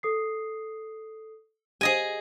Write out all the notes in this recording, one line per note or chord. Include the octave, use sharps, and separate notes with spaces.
A4 D#6 C7
G4 G#4 D#5 G#5